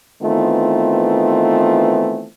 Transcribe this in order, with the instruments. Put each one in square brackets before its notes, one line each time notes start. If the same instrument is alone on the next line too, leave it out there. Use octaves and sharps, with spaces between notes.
[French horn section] D#3 E3 A3 B3 C4 F4